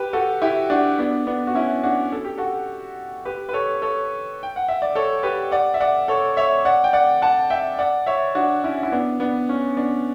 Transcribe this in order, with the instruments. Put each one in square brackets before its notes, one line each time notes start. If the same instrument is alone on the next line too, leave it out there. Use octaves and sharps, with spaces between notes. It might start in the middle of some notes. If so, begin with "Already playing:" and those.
Already playing: [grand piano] G4 B4
F#4 A4
E4 G4
D4 F#4
B3 D4
B3 D4
F#4
C#4 E4
D4 F#4
A4
G4
F#4 A4
G4 B4
B4
A4 C#5
A4 C#5
G5
F#5
E5
D5
A4 C#5
G4 B4
D5 F#5
E5
D5 F#5
A4 C#5
C#5 E5
D5 F#5
G5
D5 F#5
F#5 A5
E5 G5
D5 F#5
C#5 E5
D4 F#4
C#4 E4
E4
B3 D4
B3 D4
C#4
B3 D4